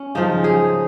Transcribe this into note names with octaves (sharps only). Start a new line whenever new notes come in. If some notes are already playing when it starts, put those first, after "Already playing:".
Already playing: C#4
C#3 F3 G#3 D#4
G#4